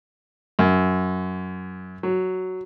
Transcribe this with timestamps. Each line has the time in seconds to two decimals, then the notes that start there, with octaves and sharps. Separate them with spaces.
0.59 F#2
2.03 F#3